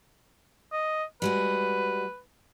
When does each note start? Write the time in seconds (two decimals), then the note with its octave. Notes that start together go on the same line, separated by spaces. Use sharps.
0.72 D#5
1.22 G3 G#3 F#4 B4